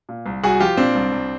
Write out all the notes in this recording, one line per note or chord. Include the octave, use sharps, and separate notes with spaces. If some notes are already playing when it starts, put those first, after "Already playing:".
A#2
C2
C2 F#4 G#4
F3 F4 G4
A#2 C4 D4
C2
C2